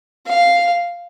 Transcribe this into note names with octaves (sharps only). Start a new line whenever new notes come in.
F5